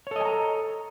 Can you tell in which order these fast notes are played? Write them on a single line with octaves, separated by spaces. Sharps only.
C#5 A4 D#5 G#5 A#5